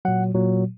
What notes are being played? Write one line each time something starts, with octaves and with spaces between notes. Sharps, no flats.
A#2 F#3 F#5
A#2 F#3